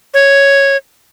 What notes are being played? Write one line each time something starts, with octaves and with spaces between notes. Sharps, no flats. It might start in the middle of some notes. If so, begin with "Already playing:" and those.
C#5